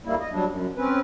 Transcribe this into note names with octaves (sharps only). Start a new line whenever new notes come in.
D2 G3 A#3 E4
D#5
F#3 G3 D4
F#2
C4 C#4 B4